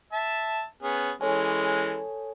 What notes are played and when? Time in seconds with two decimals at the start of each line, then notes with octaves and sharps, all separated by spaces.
0.12 E5 A5
0.83 B3 C#4 G#4
1.21 E3 G#3 C#4 A4 C#5 G#5